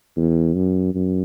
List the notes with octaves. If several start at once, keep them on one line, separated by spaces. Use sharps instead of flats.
E2
F#2
F#2